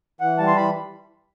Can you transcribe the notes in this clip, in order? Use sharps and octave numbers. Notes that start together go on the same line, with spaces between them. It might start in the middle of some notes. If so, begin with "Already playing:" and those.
E3 F#5
G3 A5
C6
E3 B5